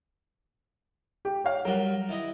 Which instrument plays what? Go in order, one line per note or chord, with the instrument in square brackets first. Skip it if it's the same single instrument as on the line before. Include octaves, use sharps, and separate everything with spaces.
[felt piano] G4
C#5 F5
[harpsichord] F#3 G3 [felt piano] A#4 F#5
[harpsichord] D#3 E4 D#5